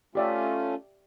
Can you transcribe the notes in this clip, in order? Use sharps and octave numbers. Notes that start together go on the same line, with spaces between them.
A3 C#4 F4 G4 D5 E5